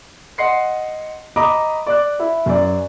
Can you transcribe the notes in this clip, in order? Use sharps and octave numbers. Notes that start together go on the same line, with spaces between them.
D#5 F#5 C6 C7 C#7
D#5 A#5 B5 D6 D#6
D5 D6 F#6
E4
F#2 D5